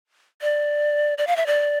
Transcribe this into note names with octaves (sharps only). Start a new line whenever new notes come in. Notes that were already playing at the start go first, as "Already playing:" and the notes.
D5
D5
F5
E5
D5